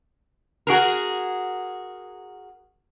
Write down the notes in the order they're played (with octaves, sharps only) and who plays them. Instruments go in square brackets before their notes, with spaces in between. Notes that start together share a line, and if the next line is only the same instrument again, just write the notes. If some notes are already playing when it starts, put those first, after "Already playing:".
[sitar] F#4 G#4 A#4